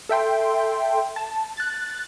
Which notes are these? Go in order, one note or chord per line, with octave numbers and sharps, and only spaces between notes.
A4 E5 G5 C6
A5
F#6 A6